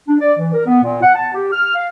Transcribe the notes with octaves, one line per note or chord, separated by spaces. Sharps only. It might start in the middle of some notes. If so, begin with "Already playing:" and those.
D4
D5
E3
A#4
B3
A#2
F#5
A5
G4
F6
F5